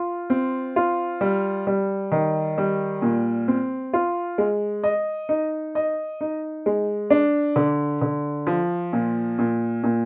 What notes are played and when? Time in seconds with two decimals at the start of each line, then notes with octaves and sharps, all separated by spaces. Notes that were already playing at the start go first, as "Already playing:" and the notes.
Already playing: F4
0.30 C4
0.76 F4
1.21 G3
1.67 G3
2.12 D#3
2.58 G3
3.02 A#2
3.48 C4
3.93 F4
4.38 G#3
4.84 D#5
5.29 D#4
5.75 D#5
6.21 D#4
6.66 G#3
7.10 D4
7.56 D3
8.01 D3
8.47 F3
8.93 A#2
9.39 A#2
9.83 A#2